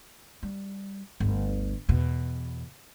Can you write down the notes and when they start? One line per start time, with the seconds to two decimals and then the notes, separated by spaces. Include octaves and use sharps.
0.43 G3
1.20 G1 D2
1.89 E2 B2